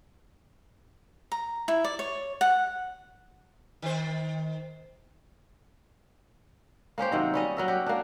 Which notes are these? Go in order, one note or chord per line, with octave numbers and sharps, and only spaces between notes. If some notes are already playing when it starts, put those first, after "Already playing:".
A#5
E4
D5
C#5
F#5
D#3 C5
A#3 C#4 G4 C5
C3 D#3 F#3
G3 C#4 D#5
F#3 A#4 E5
F#4 G4
A#3 D4